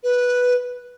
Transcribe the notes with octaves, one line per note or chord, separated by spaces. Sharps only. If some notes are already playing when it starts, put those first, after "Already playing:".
B4